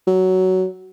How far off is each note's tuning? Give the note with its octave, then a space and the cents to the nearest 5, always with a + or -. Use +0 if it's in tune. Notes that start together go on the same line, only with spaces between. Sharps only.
F#3 +10